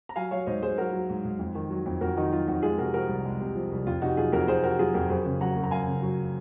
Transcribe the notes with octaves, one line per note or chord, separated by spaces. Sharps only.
A#5
F#3 F5 G#5
F#3 C#5 F5
G#2 C5 D#5
G#2 G#4 C5
F#3 F#4 A#4
F#3
G#2
G#2
F2
D#3
F#3
F2
F2 F#4 A#4
D#3 D#4 F#4
F#3 F4
F2 D#4 F#4
G#3 F4 G#4
C3 F#4 A#4
F3 F#4 A#4
C2
G#3
C3
F3
C2
F2 F4
C3 D#4 F#4
F#3 F4 G#4
F2 F#4 A#4
F2 G#4 C5
C3 F#4 A#4
F#3 F4 G#4
F2 F#4 A#4
F#2 G#4 C5
C#3
F#3 F#5 A#5
F#2
A#5
F#2 F5 G#5
C#3
F#3